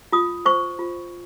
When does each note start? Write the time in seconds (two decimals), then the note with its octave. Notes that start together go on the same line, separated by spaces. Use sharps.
0.12 F4 D#6
0.46 C5 C#6
0.79 F4